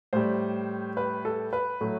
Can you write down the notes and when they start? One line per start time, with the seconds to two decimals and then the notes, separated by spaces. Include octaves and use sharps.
0.13 A2 G3 C5
0.97 B4
1.25 A4
1.53 B4
1.81 A2 F#3 A3